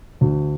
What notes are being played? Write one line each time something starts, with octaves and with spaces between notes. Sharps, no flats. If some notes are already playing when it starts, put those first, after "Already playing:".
D2